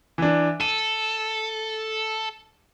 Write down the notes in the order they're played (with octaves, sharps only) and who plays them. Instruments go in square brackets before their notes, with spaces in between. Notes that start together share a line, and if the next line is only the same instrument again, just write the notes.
[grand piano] E3 D4
[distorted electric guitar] A4 [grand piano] D#7